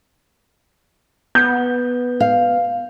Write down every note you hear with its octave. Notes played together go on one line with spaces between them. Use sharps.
B3 G6
F5